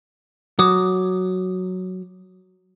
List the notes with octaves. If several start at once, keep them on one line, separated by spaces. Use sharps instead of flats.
F#3 D6 D#6